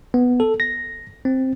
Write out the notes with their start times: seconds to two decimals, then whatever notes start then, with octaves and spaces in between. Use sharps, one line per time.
0.14 B3
0.40 A4
0.60 A#6
1.25 C4